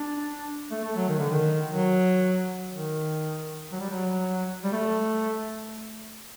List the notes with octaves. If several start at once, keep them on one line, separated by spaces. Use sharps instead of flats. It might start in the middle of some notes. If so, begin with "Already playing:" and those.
Already playing: D4
A3
A3
F#3
D#3
D3
D#3
F#3
D#3
F#3
G3
F#3
G3
A3